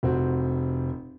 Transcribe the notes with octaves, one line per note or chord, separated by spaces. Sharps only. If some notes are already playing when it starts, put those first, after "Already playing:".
F1 C4 F#4